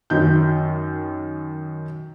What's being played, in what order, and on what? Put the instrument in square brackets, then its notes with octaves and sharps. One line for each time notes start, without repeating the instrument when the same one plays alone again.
[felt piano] F#2 D#3 G6